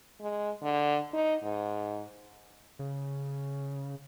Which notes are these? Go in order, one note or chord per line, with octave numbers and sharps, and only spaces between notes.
G#3
D3
D#4
G#2
C#3